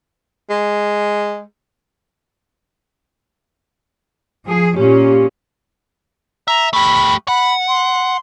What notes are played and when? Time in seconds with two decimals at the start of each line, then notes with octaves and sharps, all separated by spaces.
0.50 G#3
4.47 F3 G#4
4.77 A#2 C#4 G4
6.48 E5 A#5
6.73 A3 G4 B5
7.28 F#5 B5
7.68 C6